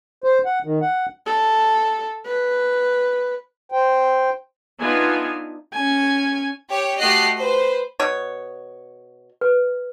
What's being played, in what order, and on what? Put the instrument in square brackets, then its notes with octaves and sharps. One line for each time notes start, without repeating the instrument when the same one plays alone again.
[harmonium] C5
F#5
D#3
F#5
[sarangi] A4
B4
[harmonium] C5 G5
[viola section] B3 D4 D#4 F4 E5 G#5
[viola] C#4 G#5
[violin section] G4 C#5
A3 F#4 G4 D#5 F#6 C7
B4 C5
[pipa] B2 C#5
[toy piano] B4